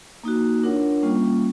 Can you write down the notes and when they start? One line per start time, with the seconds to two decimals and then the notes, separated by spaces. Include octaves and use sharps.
0.24 A#3 D#4 F#4
0.63 D4 F4 A#4 C#5 F#5
1.03 G3 A#3 C#4 F4